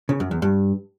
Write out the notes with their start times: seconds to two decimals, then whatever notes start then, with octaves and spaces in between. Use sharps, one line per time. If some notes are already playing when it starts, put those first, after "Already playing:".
0.09 C#3
0.20 F#2
0.31 E2
0.42 G2